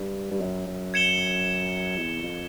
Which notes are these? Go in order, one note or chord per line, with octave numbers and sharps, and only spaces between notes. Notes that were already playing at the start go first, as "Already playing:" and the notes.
Already playing: G2
G2
F#2
F#2
G#6 C#7 E7 G7
E2
F2